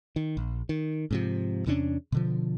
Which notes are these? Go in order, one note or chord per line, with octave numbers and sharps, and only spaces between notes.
D#3
A#1
D#3
G#2 C3 F3
E2 C3 C#4 D4
B2 D3 F3